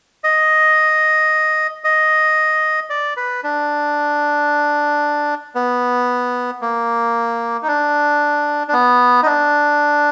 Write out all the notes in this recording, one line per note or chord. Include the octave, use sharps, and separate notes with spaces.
D#5
D#5
D5
B4
D4
B3
A#3
D#4
D4
D4
B3
D#4
D4